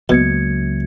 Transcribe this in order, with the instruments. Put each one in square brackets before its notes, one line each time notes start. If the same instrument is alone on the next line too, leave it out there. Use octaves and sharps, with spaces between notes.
[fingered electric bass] C#2 F#3 [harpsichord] B2 [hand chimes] A#3 G#6 C#7